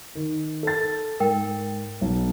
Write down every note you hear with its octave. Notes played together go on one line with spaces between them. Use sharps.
D#3
A4 A6
G#2 A#4 G5
B1